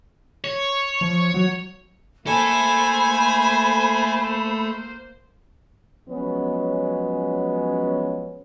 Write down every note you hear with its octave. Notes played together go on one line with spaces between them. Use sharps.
C#5
F3
F#3
A3 A#3 A4 C5 G#5 B5
F3 F#3 G#3 B3 C#4